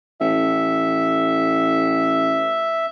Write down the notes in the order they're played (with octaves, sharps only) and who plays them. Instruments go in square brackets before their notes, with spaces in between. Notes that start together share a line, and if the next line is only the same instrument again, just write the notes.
[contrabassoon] A1 [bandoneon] E5